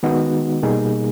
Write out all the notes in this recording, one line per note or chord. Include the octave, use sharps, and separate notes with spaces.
D#3 G#3 B3 D#4 F#4
B2 G3 A#3 D#4 G#4